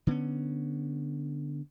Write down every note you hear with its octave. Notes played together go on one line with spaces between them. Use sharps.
D3 B3 C#4